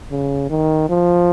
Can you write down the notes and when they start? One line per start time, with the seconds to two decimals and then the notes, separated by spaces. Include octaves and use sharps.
0.11 C#3
0.50 D#3
0.89 F3